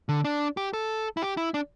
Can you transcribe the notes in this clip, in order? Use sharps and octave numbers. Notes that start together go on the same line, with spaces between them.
D3
D4
G4
A4
E4
G4
E4
D4